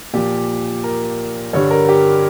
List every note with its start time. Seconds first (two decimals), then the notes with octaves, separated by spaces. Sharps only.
0.13 A#2 F3 G4
0.84 A#4
1.53 G2 D3 G3 C#5
1.71 A#4
1.89 G4